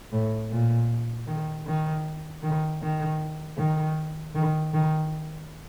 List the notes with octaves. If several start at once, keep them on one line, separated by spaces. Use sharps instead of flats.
A2
A#2
D#3
D#3
D#3
D#3
D#3
D#3
D#3